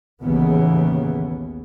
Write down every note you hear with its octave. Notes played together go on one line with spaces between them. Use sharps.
A1 D#2 C#3 E3 B3